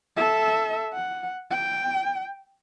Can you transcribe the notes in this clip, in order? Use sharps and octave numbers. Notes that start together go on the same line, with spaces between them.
A4 E5
F#5
G5